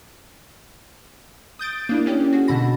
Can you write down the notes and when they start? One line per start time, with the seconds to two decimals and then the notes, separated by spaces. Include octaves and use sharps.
1.59 D#6 G6 A6 D7
1.89 A#3 D4 E4
2.06 A#3 C#4 G4
2.33 F#4 G#4
2.48 B2 D3 A5 B5 A#6